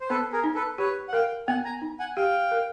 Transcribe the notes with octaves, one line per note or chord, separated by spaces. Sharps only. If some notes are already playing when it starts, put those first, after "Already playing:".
C5
B3 A4 B4
G#4 A#4
D#4
A4 B4
G4 B4 C#5
F#5
A#4 F5 G5
B3 F#5 G#5
G#5 A#5
D#4
F#5 G#5
G4 F5 G5
A#4